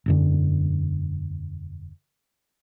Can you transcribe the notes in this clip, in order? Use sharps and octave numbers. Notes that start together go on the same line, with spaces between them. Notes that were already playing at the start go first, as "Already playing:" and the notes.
E1 F#2 D3